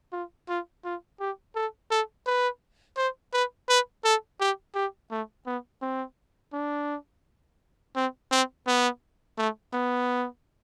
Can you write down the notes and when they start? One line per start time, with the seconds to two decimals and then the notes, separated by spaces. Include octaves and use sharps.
0.13 F4
0.49 F4
0.84 F4
1.20 G4
1.55 A4
1.91 A4
2.27 B4
2.97 C5
3.33 B4
3.69 B4
4.04 A4
4.40 G4
4.75 G4
5.11 A3
5.46 B3
5.82 C4
6.53 D4
7.96 C4
8.31 C4
8.67 B3
9.38 A3
9.73 B3